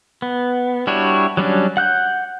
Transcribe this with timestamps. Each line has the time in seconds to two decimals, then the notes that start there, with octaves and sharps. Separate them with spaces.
0.22 B3
0.87 G3 D4 E4 F#4 C#5
1.37 F#3 G3 C#4 D4
1.77 F#5 F#6 G6